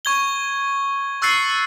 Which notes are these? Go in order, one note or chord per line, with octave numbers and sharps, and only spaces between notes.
C#6 G#6 G7
C#6 E6 F#6 A6 C7 C#7